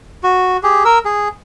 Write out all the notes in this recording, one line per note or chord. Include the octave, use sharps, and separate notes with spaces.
F#4
G4 G#4
A#4 E6
G#4